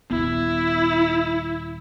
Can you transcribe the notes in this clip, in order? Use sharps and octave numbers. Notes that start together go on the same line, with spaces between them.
D#1 G#1 B3 E4